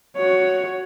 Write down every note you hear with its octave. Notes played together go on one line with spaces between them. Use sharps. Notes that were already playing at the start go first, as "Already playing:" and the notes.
F#4 C#5